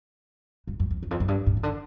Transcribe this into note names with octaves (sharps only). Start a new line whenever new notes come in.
G2
F#2
F2
E2
F2
F#2
G2
G#2
C#3
D3